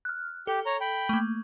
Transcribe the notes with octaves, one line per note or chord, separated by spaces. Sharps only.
F6 F#6
G4 A4
C#5 A#5
G5 B5
A3 A#3